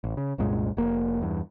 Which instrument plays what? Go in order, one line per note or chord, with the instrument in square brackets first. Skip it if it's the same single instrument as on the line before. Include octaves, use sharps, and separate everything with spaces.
[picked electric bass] A1
C#3
C2 F#2 A#2 G#3
F1 A#3
E2 G2